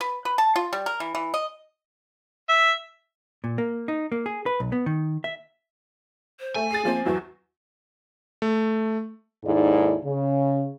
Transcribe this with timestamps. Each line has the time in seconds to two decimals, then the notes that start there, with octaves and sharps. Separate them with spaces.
0.01 B4
0.25 B4
0.38 A5
0.56 F4
0.73 G3
0.86 A#4
1.00 E3
1.15 E3
1.34 D#5
2.49 E5
3.44 A#2
3.58 A#3
3.88 D#4
4.12 A#3
4.26 G#4
4.46 B4
4.60 B1
4.72 B3
4.86 D#3
5.24 E5
6.39 C5
6.55 A3 G#5
6.71 G#4 A6 C7
6.85 F3 A#3 C4
7.06 E2 E3 F#3 F#4
8.42 A3
9.45 D#2 G#2 G#3 E4 A4 D5
10.04 C#3